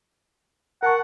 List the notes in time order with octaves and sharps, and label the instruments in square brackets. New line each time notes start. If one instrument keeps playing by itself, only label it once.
[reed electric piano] A#4 A5 C#6 [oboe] F#5